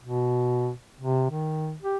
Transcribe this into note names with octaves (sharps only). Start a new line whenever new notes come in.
B2
C3
D#3
G4